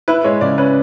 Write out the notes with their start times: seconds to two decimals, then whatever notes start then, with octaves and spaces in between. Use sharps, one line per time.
0.08 E4 B4
0.24 G#3 C#5
0.41 C#3 D5
0.58 C#4 B4